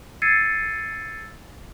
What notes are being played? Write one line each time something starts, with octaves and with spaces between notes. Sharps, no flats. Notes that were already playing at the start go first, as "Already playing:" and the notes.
E6 G#6 A6 C7 C#7 D#7